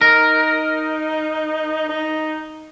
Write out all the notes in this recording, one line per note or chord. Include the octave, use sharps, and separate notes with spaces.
D#4 A#4
D#4